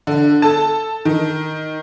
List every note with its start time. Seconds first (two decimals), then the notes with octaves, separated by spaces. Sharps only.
0.07 D3
0.42 A4 A5
1.05 D#3